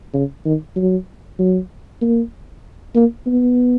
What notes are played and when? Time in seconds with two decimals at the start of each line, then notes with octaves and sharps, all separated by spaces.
0.14 C#3
0.45 D#3
0.76 F#3
1.39 F#3
2.02 A#3
2.96 A#3
3.27 B3